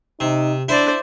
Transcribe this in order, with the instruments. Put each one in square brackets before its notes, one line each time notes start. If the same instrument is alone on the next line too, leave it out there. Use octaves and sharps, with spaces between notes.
[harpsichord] C3 [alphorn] D#4
[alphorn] D4 [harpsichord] E4 [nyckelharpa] C5 D5